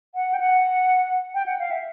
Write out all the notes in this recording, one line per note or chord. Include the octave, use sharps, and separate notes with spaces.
F#5
G5
F#5
G5
F#5
F5
E5